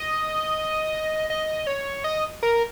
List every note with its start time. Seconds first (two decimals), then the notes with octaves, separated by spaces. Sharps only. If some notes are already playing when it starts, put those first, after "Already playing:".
Already playing: D#5
1.30 D#5
1.67 C#5
2.04 D#5
2.43 A#4